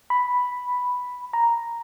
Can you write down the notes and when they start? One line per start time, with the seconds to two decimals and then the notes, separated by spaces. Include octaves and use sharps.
0.10 B5
1.33 A#5